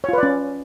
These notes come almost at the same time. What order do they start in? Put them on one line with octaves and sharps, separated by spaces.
C#5 F4 B4 D5 C#4